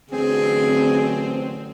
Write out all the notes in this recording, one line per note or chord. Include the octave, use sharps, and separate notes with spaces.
A1 D3 F#3 C4 G#4